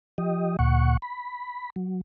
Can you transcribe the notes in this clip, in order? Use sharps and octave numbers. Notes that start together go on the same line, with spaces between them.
F3 G4 D#5
D2 A#2 F#5 C#6
B5
F#3